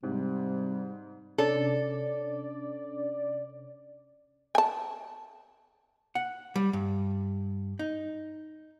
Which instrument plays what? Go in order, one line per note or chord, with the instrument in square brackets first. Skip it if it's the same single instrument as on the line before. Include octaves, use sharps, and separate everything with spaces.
[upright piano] G#2 [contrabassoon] C3 [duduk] G3
[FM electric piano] C3 C#4 D4 [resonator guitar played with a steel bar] A4 [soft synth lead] D5
[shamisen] G#5 A5
[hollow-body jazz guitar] F#5
G3
G2
D#4